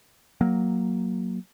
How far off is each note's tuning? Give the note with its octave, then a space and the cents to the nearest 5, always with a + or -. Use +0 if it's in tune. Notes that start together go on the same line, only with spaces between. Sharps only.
F#3 +0 A#3 +0